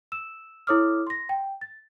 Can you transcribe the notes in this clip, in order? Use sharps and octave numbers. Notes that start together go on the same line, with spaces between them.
E6 E7
E4 A4 C#5 D6 D#6 F6
C6 A#6
G5
A6